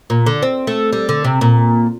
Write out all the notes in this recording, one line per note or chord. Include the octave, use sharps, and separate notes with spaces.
A#2
D3
C4
A3
G3
D3
C3
A#2